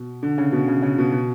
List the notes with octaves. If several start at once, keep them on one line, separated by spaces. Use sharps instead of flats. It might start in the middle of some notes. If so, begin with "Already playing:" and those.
Already playing: B2
D3
C#3
B2
C#3
C#3
B2
B2